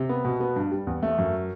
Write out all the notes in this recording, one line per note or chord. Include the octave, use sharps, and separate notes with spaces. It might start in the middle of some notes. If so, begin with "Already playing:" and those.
Already playing: C3
B3
B2
B3
G2
G3
E2
A3
F#2